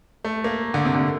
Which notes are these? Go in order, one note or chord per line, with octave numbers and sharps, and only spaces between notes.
A3
A#3
D3
C3
D3